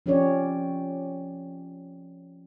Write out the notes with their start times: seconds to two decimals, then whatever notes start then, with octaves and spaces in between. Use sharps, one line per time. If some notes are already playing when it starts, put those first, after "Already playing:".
0.06 F3 C4 C#4 G4 C#5 D5